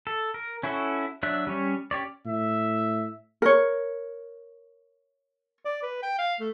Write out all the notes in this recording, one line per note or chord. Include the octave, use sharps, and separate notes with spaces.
A4
A#4
C#4 E4 F#4 A4
F#3 D4 E5 F#6
G3 C#4 C#5
C#4 G4 C#5 D5
A2 E5
A#4 C#5
D5
B4
G5
F5
A3